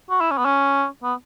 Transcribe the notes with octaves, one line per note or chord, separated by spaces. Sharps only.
F#4
E4
C#4
B3
C#4
B3